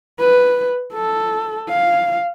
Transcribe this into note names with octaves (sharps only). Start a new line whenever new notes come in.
B4
A4
F5